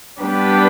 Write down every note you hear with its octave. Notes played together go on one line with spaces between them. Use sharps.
G3 B3 D4 G4 B4